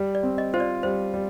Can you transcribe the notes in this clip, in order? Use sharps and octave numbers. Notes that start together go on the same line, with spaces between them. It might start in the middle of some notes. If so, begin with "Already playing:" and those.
Already playing: G3
D5
C4
D#5
F4 C5
D5
G3 C5
G3